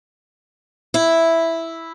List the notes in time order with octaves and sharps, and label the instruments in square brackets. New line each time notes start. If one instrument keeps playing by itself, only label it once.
[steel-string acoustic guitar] E4